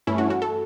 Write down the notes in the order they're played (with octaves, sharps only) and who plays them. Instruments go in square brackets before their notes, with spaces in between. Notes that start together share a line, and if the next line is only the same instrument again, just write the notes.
[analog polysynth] G2 E3 A3 C#4 [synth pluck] E4
[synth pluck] F#4
F#4
A4